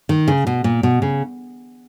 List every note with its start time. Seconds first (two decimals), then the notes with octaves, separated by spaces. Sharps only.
0.09 D#3
0.28 C#3
0.47 B2
0.64 A#2
0.83 B2
1.02 C#3